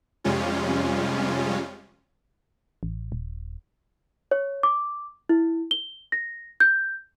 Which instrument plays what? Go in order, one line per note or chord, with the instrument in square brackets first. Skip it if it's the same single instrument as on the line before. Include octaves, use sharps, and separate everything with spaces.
[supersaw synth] F2 C3 G3 G#3 C#4 F4
[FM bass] A1
D#1
[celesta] C#5
D6
E4
G7
A#6
G6